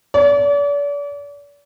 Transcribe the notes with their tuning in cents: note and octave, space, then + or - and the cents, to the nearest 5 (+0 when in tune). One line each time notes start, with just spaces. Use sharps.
D5 -40